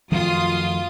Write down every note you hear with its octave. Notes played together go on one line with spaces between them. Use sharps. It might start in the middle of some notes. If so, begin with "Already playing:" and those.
F#2 D#3 F3 A3 F4 D#6